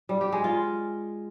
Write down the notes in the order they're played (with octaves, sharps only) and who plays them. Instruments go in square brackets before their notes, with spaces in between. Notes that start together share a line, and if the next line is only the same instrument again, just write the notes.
[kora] G3
G4
G#3
F4